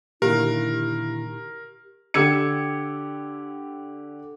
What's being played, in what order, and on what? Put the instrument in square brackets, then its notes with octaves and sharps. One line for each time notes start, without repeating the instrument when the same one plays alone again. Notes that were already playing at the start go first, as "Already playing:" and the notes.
[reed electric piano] A#2 D3 D#3 [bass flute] E4 [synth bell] G4 [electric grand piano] A#4
[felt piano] D3 G4 E6 G#6 C#7